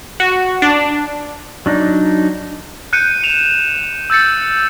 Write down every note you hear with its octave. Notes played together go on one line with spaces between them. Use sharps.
F#4
D4
F#3 D4 D#4
F#6 G6 C#7 D#7
E7 F7
E6 G6 A6 C#7